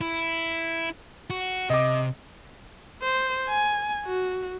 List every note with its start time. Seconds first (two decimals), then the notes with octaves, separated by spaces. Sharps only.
0.01 E4
1.30 F#4
1.70 C3 D#5 D6
3.02 C5
3.48 G#5
4.05 F#4